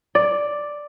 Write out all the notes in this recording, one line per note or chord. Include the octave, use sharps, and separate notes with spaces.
D5